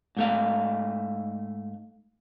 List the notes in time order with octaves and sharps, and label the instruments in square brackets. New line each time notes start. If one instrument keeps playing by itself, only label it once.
[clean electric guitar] G#2 A3 F5